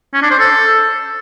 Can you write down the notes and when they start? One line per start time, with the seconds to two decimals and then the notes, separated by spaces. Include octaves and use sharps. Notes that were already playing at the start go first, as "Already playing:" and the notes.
0.14 C#4
0.22 D4
0.31 C5
0.39 A4